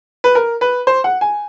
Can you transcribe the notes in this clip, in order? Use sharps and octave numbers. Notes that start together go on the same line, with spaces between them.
B4
A#4
B4
C5
F#5
G#5